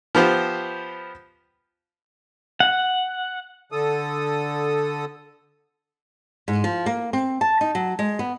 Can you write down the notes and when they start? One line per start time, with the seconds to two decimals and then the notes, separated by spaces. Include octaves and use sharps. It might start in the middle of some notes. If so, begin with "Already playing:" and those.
0.15 F3 B3 G4 C5
2.60 F#5
3.72 D3 A4 D#6
6.48 G#2
6.64 F3
6.86 A#3
7.13 C4
7.41 A5
7.61 D#4
7.75 F#3
7.99 G#3
8.19 B3